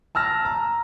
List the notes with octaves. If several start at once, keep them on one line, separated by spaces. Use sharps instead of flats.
A5 E6 F6 A#6
A#5